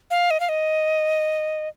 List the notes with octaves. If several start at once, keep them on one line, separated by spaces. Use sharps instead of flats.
F5
D#5
F5
D#5